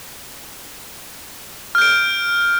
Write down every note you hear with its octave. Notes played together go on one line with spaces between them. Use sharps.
F6 G6 D7